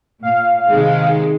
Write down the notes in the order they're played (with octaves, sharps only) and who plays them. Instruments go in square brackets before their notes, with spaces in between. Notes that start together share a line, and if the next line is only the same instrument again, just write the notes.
[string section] A#2 [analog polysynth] F5
[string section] C3 D#3 G#3